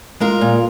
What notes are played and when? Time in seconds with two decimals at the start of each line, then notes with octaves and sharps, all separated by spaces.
0.20 G#3 F4 A#4
0.41 A#2